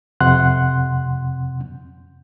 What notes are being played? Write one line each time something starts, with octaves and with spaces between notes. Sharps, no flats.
F2 C3 F#5 C6 F#6